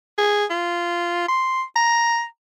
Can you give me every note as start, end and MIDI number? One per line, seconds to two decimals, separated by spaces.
0.18 0.45 68
0.50 1.28 65
1.28 1.63 84
1.76 2.24 82